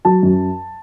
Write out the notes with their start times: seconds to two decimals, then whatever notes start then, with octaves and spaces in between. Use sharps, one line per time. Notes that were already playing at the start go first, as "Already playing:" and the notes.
0.05 F#3 A5
0.23 F#2